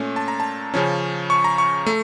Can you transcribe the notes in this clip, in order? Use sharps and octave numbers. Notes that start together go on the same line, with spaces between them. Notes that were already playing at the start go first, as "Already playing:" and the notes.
Already playing: A#2 A3 C#4
A5
A#5
A5
C#3 F3 C#4
C#6
A#5
C#6
A3